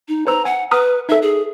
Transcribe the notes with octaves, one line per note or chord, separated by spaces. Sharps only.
D#4
B4 C5 A#5 E6
F#5 G#5
B4 A#5 D#6 F6
D#4 A4 E5
G#4